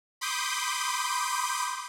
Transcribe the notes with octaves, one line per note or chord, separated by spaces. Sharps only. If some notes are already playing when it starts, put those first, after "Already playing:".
B5 C6 D6 D#6 G6